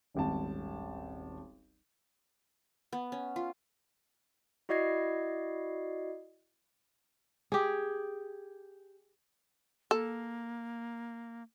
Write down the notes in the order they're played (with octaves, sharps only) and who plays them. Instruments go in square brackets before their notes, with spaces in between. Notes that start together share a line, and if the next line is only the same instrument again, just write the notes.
[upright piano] D#1 G#1 A5
[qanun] B3
C#4
F4
[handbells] E4 F#4 D5 D#5 G#6 C7
[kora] G4 G#4
[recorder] A#3 [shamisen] A4